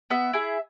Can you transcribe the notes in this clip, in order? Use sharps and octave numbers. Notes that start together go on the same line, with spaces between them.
B3 E5
E4 G#4